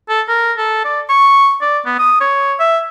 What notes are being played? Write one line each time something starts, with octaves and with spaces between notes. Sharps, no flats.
A4
A#4
A4
D5
C#6
D5
B3
D#6
C#5
E5